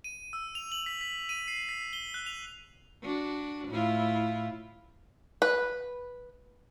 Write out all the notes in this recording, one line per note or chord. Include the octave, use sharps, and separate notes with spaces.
D#7
E6
F7
F#7
B6
B6
D#7
C7
B6
G7
F#6
F7
D4 F#4
A2 E4 F4
B4